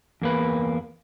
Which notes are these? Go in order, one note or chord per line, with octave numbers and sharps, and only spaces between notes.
E2 A#3 B4